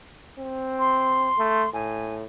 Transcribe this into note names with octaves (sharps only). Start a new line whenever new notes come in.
C4
C6
A3
A2 G#5